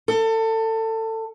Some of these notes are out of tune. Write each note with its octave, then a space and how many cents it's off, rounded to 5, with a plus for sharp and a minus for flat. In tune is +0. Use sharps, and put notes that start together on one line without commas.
A4 +25